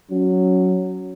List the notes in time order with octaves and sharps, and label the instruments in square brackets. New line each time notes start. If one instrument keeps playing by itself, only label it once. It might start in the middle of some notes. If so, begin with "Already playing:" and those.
[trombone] F#3 [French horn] C#4